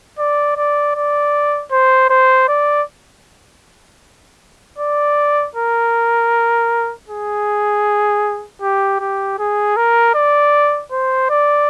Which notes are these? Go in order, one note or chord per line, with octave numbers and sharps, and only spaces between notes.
D5
D5
D5
C5
C5
D5
D5
A#4
G#4
G4
G4
G#4
A#4
D5
C5
D5